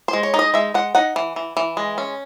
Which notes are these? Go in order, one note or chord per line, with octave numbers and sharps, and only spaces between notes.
C5
G#3
C#5
D#4
D#5
G#3 E5
G#3 F#5
D#4 F#5
E3
E3
E3
G#3
C#4